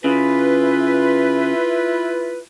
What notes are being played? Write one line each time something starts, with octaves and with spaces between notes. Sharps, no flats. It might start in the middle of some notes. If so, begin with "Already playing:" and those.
C#3 E4 F4 B4